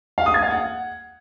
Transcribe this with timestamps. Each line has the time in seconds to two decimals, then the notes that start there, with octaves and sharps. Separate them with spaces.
0.18 F5
0.26 D#6
0.34 G#6
0.42 F5
0.51 F#5